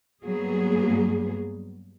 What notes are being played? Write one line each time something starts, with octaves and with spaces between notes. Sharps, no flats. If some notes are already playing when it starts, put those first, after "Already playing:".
G2 F#3 A#3 B3 G#4